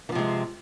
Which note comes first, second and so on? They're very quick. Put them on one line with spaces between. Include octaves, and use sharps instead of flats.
E3 F3 C3 G#3